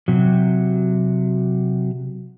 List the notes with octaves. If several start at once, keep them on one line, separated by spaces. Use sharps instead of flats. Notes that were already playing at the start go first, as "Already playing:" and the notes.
C3 F#3